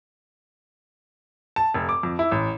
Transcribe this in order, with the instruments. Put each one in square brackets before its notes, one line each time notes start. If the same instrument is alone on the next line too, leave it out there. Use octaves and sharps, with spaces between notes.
[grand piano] A5
F1
D6
F2
E4
A1